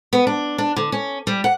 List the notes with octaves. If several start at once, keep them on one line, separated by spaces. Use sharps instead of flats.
B3
D4
D4
D3
C#4
G3
F#5